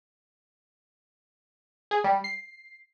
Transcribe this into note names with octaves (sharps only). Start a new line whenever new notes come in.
G#4
G3
C7